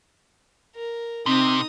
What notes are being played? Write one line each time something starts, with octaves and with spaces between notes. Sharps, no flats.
A#4
C3 C4 D#4 D#6